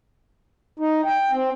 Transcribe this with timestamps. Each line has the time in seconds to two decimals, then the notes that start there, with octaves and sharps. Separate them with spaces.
0.79 D#4
1.05 G5
1.32 C4